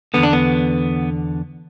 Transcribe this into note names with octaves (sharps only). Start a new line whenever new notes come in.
E2 D3 B3
D4
B3